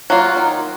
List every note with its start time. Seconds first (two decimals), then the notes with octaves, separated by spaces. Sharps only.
0.10 F#3 A#3 F4
0.37 D#3